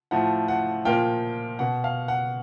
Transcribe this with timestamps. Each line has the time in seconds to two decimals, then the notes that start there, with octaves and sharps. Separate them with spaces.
0.11 A2 F3 F#5
0.48 F#5
0.85 A#2 F3 F5 G5
1.59 B2 F#5
1.84 F5
2.08 F#5